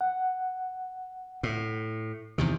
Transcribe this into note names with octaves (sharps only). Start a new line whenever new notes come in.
F#5
A2
E2 C3 D#3